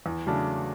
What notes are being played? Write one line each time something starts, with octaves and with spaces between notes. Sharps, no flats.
E2
C#3 F#3 A3 D4